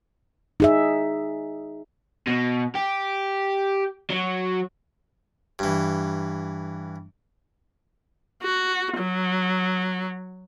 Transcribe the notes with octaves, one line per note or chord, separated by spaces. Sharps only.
D#4 G#4 E5
B2
G4
F#3
G2 E3
F#4
F#3